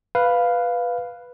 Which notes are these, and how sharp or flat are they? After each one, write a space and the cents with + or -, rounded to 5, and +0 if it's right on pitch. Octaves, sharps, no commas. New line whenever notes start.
B4 +0 F5 +0